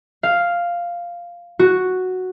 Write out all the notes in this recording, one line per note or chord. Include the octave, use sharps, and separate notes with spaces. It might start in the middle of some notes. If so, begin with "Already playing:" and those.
F5
F#4